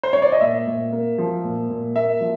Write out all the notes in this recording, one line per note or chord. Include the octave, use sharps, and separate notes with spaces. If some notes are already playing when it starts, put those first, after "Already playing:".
C5
C#5
D5
D#5
A#2 E5
A#2
A#3
F3
A#2
A#2
A#3 E5
F3